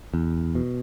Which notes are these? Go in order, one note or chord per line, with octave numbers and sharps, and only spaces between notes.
E2
B2